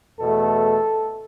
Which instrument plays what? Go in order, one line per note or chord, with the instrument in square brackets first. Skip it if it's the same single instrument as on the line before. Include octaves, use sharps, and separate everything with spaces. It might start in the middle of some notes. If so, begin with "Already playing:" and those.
[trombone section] E2 B2 A3 A4